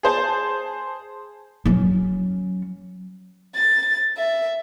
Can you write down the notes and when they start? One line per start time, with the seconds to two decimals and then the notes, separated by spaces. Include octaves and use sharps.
0.03 G#4 C5 A5
1.65 F#3 C#4
3.55 A6
4.17 E5